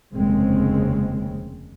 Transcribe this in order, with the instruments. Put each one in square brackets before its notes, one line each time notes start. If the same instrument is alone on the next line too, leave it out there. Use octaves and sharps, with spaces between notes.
[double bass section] F1 D#2 C#3 G#3 C4